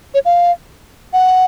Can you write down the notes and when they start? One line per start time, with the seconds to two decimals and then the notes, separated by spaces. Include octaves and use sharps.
0.14 C#5
0.25 F5
1.13 F#5